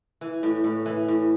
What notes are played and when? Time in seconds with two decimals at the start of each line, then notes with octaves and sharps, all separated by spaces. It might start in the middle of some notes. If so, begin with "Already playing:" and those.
0.21 E3
0.43 A2
0.64 A2
0.86 E3
1.08 A2